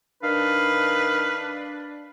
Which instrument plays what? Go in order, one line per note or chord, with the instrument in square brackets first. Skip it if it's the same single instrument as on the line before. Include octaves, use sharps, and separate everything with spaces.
[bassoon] D#3 [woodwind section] D4 [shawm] B4 [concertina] F5